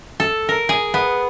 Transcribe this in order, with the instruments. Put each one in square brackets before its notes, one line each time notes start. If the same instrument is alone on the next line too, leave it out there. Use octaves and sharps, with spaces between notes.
[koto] A4
A#4
G#4
B3